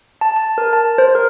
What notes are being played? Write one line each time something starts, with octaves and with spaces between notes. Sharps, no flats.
A5
A5
A#4
A5
C5
A#4